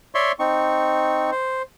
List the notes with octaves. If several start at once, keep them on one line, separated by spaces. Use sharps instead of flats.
C#5 D5 E5 C6 C#6
C4 D#4 C#6
C5